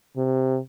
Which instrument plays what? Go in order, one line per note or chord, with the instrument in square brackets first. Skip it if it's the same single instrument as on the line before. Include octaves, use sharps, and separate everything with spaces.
[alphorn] C3